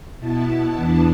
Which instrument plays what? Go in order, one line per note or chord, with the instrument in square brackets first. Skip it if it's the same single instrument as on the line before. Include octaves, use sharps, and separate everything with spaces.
[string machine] B2 B3 E4 A5
E2 E3 B3 D4 A5